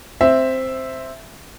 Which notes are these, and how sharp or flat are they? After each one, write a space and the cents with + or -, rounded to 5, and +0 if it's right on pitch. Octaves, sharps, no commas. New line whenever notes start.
C4 +0 E5 +0